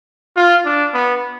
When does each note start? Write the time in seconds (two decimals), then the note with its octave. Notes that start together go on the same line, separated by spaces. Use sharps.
0.36 F4
0.65 D4
0.94 B3